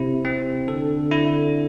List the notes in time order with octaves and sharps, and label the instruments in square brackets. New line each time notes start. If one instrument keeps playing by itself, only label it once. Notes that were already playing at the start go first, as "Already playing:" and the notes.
Already playing: [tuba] C3 [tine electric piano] E4
[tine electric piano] C4
[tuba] D3 [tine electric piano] A4
[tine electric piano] E4